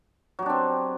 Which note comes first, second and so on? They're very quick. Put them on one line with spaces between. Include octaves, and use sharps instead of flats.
F#3 G4 D4 C4